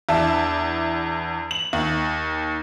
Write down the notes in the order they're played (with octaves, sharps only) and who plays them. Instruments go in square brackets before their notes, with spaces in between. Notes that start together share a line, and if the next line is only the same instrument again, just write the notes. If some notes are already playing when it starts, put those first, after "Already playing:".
[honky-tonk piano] E2 D4 E5 A5
F#7
D#2